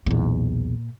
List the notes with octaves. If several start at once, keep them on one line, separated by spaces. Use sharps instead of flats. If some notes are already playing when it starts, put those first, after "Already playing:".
B1 E2 A#2